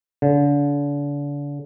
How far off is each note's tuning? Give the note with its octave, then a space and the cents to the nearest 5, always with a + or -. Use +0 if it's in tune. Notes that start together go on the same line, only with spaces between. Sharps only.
D3 -35